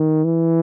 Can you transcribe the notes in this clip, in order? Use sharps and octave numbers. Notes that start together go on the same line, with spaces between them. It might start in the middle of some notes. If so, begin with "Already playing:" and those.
Already playing: D#3
E3